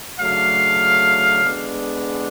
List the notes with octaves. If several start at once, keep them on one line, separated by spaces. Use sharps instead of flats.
C#3 F#3 A3 D4 F5
D3 G#3 B3 D4